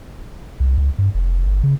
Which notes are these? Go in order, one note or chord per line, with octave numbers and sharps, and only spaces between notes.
C2
C#2
G2
F1
G1
C#3